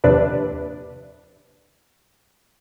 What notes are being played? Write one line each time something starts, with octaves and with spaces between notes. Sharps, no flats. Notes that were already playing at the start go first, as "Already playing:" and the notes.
D#2 C3 F3 D4 B4 D5